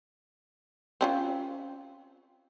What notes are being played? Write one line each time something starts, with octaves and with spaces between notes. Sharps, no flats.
C4 C#4 F4